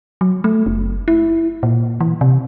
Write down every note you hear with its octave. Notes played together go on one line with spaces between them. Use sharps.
F#3
A3
F#1
E4
A#2
E3
C3